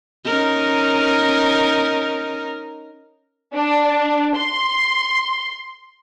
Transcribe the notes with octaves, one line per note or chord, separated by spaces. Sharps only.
C#4 D#4 A#4
D4
C6